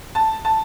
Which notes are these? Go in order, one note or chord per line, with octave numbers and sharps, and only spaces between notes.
A5
A5